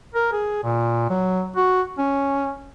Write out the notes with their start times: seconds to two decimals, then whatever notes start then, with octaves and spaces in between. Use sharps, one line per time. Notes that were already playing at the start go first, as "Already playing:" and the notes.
0.14 A#4
0.33 G#4
0.63 A#2
1.10 F#3
1.56 F#4
1.98 C#4